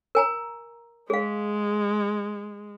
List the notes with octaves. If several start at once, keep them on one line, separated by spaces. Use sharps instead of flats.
A#4 G#5 A#5
G#3 G#4 F5